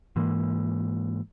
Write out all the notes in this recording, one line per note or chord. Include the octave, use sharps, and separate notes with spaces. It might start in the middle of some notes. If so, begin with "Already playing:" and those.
G#2 E3 A#3